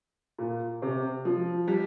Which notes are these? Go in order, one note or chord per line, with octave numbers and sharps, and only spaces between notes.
A#2
C3
F3
G3